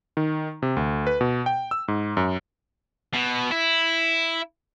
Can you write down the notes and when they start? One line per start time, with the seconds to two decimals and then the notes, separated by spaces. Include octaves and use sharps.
0.17 D#3
0.62 C3
0.77 D2
1.07 B4
1.21 B2
1.46 G5
1.71 E6
1.88 G#2
2.17 F#2
3.14 B2
3.51 E4